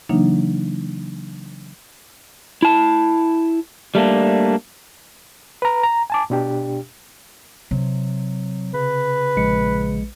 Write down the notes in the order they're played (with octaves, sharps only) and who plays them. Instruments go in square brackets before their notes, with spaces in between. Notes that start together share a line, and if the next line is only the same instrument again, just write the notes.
[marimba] C#3 E3 F#3 A#3 D4 D#4
[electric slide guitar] E4 A5
G3 A3 A#3 D4
[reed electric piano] B4 A#5
A#5
G#5 A5 D6
B2 D4 G4
[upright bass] C3 [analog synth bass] F#3
[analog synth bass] C#3 [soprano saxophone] B4
[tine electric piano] A#1 G#3 C#7